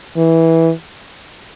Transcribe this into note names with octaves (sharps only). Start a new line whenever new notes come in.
E3